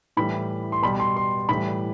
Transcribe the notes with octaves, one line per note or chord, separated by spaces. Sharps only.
A2 E3 G3 B5
C6
B2 G3 B5
C6
C6
A2 E3 G3 B5